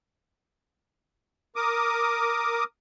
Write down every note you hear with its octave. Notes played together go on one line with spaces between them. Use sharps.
A#4 D6 D#6